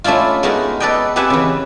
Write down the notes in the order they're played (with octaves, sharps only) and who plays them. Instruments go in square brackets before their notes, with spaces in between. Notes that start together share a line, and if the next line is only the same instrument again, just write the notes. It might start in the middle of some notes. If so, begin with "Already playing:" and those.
[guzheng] A3 C#4 D4 E4 F4
G#3 A3 B3 D#4 F#4 A#4
A4 B4 D5 D#5 G5
C4 G4 B4 E5 F#5 G#5
C#3 E3